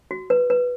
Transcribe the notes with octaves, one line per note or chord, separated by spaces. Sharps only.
F#4
B4
B4